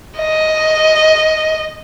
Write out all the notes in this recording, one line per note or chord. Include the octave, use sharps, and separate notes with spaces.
D#5